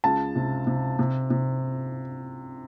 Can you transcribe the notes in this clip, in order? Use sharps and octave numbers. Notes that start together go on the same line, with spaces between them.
C#2 A5
C3
C3
C3
C3